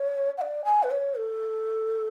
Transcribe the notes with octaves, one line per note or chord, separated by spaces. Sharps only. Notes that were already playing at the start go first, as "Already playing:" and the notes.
Already playing: C#5
F#5
D5
G#5
B4
C#5
A4